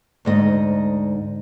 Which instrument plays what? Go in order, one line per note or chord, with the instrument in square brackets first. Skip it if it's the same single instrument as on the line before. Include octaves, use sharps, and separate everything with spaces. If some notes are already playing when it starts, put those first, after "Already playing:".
[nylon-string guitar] D2 G#2 D#5